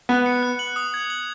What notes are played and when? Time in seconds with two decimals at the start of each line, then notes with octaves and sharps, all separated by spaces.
0.09 B3 F#6
0.26 C#7
0.43 F#6
0.59 F#7
0.76 D#6
0.94 G#6
1.10 F#7